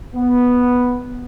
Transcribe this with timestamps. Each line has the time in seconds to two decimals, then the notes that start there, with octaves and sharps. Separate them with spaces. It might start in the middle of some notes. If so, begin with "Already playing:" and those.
0.15 B3